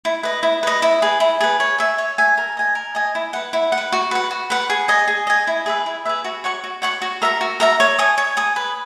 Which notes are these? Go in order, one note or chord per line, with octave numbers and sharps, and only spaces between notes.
E4
B4 D#5
E4
B4 D#5
E4
G#4 B4
E4
G#4 B4
C#5
E5 G#5
C#5
E5 G#5
A#4
D#5 G#5
A#4
D#5 G#5
E4
B4 F#5
E4
F#5
B4
F#4
B4 F#5
F#4
B4 F#5
G#4
D#5 G#5
G#4
D#5 G#5
E4
G#4 B4 E5
E4
G#4 B4 E5
F#4
C#5 F#5 C#6
F#4
C#5 F#5 C#6
F#4
A#4 E5 A#5
F#4
A#4 E5 A#5
C#5
G#5 D#6
C#5
G#5 D#6
B4